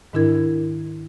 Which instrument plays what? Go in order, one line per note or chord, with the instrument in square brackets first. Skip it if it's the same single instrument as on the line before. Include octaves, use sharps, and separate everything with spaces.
[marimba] G#2 D#3 D4 E4 A#4 G#6